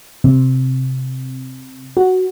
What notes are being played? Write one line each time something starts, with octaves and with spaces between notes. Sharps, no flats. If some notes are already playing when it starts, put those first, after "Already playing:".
C3
F#4